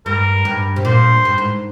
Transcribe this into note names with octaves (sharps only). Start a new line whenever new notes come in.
G2 A#4
G2
C3
A#2 C5
G2
G#2